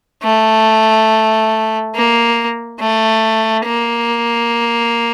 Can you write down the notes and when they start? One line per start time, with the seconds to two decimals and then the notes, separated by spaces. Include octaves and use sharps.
0.23 A3
1.95 A#3
2.80 A3
3.65 A#3